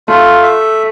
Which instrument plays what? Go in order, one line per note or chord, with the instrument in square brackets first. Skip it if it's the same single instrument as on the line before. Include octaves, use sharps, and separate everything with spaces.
[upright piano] A3 [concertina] F4
[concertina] E5